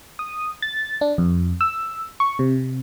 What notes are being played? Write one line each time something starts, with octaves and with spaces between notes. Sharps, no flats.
D#6
A6
D4
F2
E6
C#6
C3